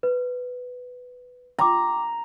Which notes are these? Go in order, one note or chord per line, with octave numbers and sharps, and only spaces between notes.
B4
G5 A#5 C6 D6